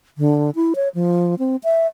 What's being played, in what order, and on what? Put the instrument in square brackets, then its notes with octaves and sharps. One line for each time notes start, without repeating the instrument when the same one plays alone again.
[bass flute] D3
E4
C#5
F3
C4
E5